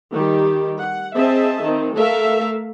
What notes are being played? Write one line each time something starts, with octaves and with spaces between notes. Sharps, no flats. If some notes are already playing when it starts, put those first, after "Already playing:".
D#3 G3 G4
F#5
C4 G#4 D#5 E5 A5
D#3 C4
A3 A4 A#4 E5 F5